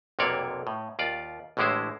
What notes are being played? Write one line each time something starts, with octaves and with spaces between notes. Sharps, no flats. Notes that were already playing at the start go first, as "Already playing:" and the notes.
B1 F2 C3 A#3 C#5 D5
A2
D#2 F4 D5
A1 A2 D3 G#3 E4 C5